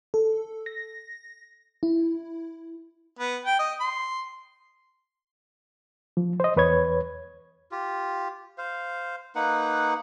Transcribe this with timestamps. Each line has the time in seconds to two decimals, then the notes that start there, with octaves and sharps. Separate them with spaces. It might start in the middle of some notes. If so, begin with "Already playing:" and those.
0.14 A4
0.66 A#6
1.83 E4
3.19 B3
3.45 G5
3.59 D#5
3.80 C6
6.17 F3
6.40 C5 D#5
6.56 E2 B4 C#5 G#6
7.72 F4 G4
8.58 C5 F5
9.35 A#3 D#4 B4 F#5